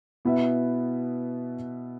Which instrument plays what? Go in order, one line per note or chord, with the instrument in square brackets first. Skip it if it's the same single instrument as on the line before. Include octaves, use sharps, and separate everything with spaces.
[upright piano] B2 B3 E4 B4 E5